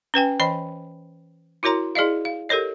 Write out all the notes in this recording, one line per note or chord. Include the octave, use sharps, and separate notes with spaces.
C#4 B4 G5 G#5
E3 C5 D#5 G5 B5
E4 F#4 A#4 C#5 A#5 C6
E4 G#4 D5 D#5 F5
F5
G4 A4 A#4 C#5 D#5